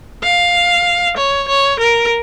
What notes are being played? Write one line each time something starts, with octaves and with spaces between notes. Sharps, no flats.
F5
C#5
C#5
A#4